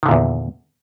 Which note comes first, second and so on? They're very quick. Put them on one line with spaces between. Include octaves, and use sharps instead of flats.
D#3 D3 A#2 E2